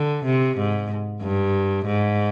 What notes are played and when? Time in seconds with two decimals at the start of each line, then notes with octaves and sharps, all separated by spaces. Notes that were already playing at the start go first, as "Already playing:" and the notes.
Already playing: D3
0.25 C3
0.57 G#2
1.21 G2
1.86 G#2